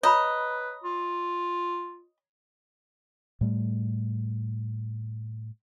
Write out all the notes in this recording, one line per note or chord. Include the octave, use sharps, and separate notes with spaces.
B4 C#5 D#5 A#5 B5
F4
A2 G3 A3